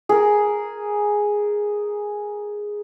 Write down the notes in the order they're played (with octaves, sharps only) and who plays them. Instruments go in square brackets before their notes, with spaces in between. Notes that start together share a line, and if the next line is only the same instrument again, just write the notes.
[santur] G#4 A#4